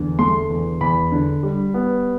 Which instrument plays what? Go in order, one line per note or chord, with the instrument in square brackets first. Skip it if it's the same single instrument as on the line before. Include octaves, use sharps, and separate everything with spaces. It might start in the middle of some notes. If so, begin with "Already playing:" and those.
Already playing: [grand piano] E2 D3
A3 C6
E2
E2 B5
D3
G3
B3